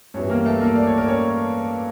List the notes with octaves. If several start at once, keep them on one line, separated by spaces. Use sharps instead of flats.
G2 E3 G3 C#4 C#5
A#3 A#4
A3 A4
A#3 A#4
D5
C#5
A#4
C#4 C#5